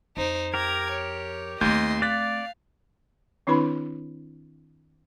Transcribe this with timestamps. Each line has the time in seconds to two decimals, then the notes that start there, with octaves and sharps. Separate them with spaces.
0.17 F2 D#4 C5
0.54 G4 A#4 A#5 G#6
0.91 C#5
1.61 D#2 A3 C4 D#5 C6 G6
2.02 D5 F5 F#6 A6 B6
3.47 D#3 C4 D4 E4 B4 B5